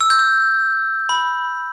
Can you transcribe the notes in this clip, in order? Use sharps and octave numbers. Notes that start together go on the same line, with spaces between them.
E6
G6
E6
B5